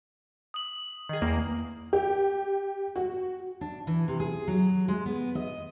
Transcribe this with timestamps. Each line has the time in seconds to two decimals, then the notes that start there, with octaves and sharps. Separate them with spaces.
0.54 D#6 F#7
1.09 D#3 G#4
1.22 E2 A#3
1.93 G4
2.96 F#4
3.61 D4
3.87 E3
4.08 C3
4.20 G#4
4.48 F#3
4.88 G#3
5.06 B3
5.35 D#5